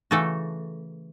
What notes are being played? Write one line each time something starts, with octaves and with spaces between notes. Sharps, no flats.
C#3 E3 A3 F#4 A4